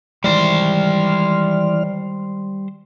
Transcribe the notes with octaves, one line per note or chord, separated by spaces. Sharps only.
D#3 E3 G3 G#3 C5 D5 F6